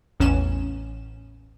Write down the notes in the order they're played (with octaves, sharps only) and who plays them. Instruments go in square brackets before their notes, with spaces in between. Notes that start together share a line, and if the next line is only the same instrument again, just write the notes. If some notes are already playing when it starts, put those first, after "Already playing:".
[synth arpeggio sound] A1 E2 C#4 E7